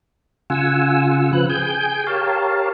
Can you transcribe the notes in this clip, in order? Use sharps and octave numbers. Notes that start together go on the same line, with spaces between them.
C#3 F4 F#5 G#5 E6
C#3 F3 B4 F#6
G#4 G5 G#5 G6
G4 A#4 C#5 F5 A5